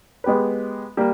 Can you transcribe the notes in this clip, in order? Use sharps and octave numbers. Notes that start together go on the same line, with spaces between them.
G#3 B3 G4 B4
G3 A#3